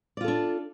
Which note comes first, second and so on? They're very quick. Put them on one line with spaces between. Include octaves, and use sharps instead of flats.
D5 F4 A4 D4